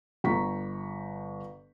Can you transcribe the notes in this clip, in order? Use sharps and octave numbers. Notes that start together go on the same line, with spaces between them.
G1 A#5 C#6 B6